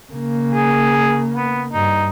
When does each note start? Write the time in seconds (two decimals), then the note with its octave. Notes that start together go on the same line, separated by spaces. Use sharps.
0.12 C#3 A#3
0.53 G#4
1.35 B3
1.73 G2 D#4